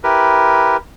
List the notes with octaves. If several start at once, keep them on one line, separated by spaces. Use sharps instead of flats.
E4 G4 A#4 B4